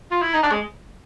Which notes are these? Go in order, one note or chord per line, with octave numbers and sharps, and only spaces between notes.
F4
E4
D#4
D4
G#3